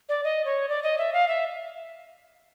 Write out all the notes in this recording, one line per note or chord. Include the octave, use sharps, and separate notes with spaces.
D5
D#5
C#5
D5
D#5
E5
F5
E5